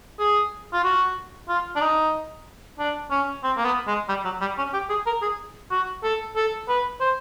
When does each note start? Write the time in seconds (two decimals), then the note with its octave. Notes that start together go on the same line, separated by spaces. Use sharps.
0.19 G#4
0.73 F4
0.84 F#4
1.49 F4
1.76 D4
1.81 D#4
2.79 D4
3.11 C#4
3.44 C4
3.57 A#3
3.65 B3
3.87 G#3
4.09 G3
4.25 F#3
4.41 G3
4.58 C#4
4.73 G4
4.89 G#4
5.06 A#4
5.22 G#4
5.71 F#4
6.03 A4
6.36 A4
6.69 B4
7.00 C5